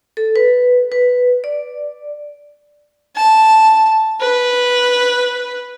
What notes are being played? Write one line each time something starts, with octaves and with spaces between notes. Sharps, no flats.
A4
B4
B4
D5
A5
B4